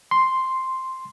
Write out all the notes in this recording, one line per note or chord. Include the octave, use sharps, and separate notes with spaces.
C6